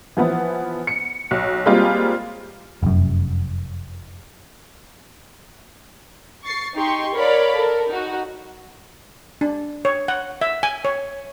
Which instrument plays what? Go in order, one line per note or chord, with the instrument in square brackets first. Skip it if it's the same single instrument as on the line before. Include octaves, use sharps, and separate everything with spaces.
[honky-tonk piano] E3 F3 B3 E4
C#7
B1
G3 G#3 A#3 C4 F4 G4
[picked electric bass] F1 F#2
[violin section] C#6 A6 C7
D#4 G4 C6 C#6
A#4 C#5 D5 F5 B5
A4 A#4
D#4 F#4
[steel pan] D4
C#5
F#5
E5
G#5
C#5